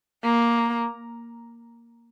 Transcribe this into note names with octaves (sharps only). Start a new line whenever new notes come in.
A#3